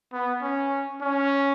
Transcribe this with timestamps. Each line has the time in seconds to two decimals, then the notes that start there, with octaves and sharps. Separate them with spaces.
0.13 B3
0.42 C#4
1.01 C#4